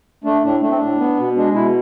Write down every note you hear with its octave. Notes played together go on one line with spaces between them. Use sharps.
A3 D4
A2 D4
A3 D4
C4
A2 D4
B3
B2
G#3 D4
B2 E4